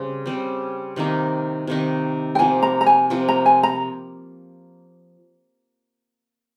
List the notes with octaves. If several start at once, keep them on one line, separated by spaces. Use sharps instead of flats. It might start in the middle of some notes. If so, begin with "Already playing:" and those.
Already playing: C#3 G3 C4
C#3 G3 C4
C3 D#3 A#3 D#4
C3 D#3 A#3 D#4
G5
C3 F3 A#3 G#5
A#5
A#5
G#5
C3 F3 A#3
A#5
G#5
A#5